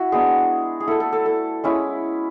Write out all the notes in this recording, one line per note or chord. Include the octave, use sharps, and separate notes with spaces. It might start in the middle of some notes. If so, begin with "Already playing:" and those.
Already playing: E4 F#4
G#3 B3 D4 G#4
G#4
A3 E4 A4
A4
A4
A4
G#3 C#4 E4